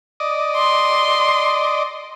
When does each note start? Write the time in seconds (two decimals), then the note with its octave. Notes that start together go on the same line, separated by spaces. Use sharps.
0.20 D5 D#5
0.57 C6